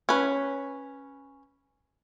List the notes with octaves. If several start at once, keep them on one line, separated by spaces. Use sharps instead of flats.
C#4 B4